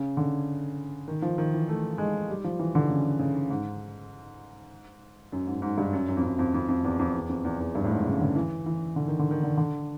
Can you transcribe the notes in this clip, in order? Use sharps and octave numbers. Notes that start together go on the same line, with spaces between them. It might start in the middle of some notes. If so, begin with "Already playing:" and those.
Already playing: C#3
D3
D#3
F3
D#3
E3
A3
G#3
G3
F3
E3
D3
C#3
C#3
G#2
F#2
G#2
G#2
G2
F#2
F#2
F2
F#2
F2
F2
F2
E2
F2
E2
F2
E2
E2
G2
A2
G#2
C#3
D3
E3
E3
D3
D#3
D3
D#3
D3
D3